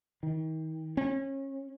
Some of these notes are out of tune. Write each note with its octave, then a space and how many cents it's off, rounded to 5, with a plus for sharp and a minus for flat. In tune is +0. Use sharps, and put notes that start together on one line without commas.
D#3 +35
C#4 -30